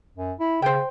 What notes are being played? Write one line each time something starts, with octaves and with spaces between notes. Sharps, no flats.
F#2
E4
C#3 C5 G5